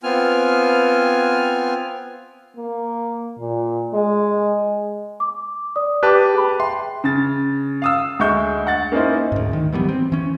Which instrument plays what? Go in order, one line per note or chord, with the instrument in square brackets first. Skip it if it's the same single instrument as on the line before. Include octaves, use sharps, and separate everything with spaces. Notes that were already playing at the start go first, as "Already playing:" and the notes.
[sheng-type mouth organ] B3 C4 F4 G#5 F6
[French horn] A#3
A#2
G#3
[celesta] D6
D5 D#6
[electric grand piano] G4 B4 A5 [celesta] D6 F#6
[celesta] G#4 G5 B5
[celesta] E5 G5 [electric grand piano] C6
[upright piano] C#3 A6
F5 D#6 E6
D2 G#3 E5 C#6 G6
F#5 A6
A#3 C#4 D#4 E4 C5
[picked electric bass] D2 G#2
D#3
E3 F#3 G3 B3
C4
E3 C#4